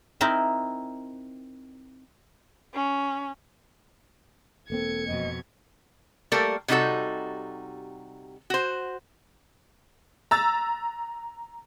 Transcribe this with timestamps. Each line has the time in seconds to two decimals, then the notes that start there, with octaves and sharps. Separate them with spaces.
0.21 C4 D#4 E4 A#4
2.74 C#4
4.70 E1 A#3 C4 A4 G#6 C#7
5.07 F2 B2 D#5
6.32 G3 A3 A#3 A4 A#4
6.68 C3 G3 D#4 F#4 A4
8.50 F#4 C5
10.31 A#5 E6 A6